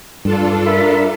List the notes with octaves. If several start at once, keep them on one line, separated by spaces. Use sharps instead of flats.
G2 D4 F4 A4
A#4 E5 B5